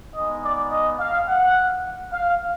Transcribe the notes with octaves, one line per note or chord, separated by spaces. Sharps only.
G#3 B3 D#4 D#5
D5
D#5
F5
F#5
F5